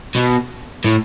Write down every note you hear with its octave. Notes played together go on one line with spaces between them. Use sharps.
B2
A2